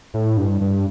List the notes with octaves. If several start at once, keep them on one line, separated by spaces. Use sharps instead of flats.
A2
G2
G2